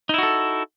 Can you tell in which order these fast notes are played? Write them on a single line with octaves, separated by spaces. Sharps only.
D#4 E4 F#4 A4